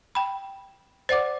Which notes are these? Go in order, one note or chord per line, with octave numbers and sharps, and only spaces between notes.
G5 B5
C5 D5 F#5 D6